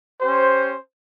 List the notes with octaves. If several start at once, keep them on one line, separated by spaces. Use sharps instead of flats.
C#4 G4 C5